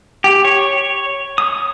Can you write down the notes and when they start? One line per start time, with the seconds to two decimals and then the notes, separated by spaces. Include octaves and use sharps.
0.24 G4
0.45 C#5
1.38 D#6